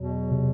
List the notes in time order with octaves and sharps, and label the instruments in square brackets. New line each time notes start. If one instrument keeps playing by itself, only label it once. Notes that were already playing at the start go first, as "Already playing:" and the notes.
Already playing: [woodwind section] E2 B2 F#3
[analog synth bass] C3